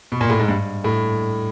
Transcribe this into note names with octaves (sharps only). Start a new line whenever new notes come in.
B2
A#2
A2
G#2
G2
A2